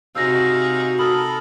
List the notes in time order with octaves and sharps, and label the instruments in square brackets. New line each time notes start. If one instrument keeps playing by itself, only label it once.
[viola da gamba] C3 D#4 G#4 [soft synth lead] F#4 [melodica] C5 F5 [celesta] E6 A#6
[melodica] A4 A#4 [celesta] B5 D#6 F#7